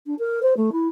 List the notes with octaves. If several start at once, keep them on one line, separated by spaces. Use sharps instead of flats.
D4
A#4
C5
A3
E4